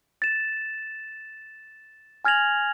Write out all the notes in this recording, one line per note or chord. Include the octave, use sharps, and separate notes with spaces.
A6 E7
G#5 F6 G#6 A#6 F7 F#7